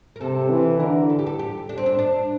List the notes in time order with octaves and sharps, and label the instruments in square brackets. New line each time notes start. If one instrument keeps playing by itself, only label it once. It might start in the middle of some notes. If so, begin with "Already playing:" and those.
[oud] A#4
[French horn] C3 [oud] A4
[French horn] E3
[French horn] D3 [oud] A#4
[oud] A4
G4
A4
G4
D4
C4
D4
D4